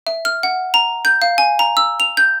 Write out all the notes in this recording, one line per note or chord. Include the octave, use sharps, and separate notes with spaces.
E5
F6
F#5
A#5
G6
F5
G#5
A#5
E6
F7
G6